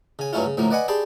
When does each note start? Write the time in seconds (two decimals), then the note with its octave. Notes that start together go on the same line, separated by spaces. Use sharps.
0.19 C#3 G#5
0.33 G2 F#3 A3 C#4 E4 F4
0.46 C#3
0.57 D2 A2 F3 F#3 A#3
0.71 B4 D5 D#5 F#5 G#5 B5
0.88 G4 G#4 D5 A5 B5 C6